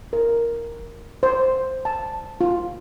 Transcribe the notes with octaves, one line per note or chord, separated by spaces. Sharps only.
A#4
C5
A5
F4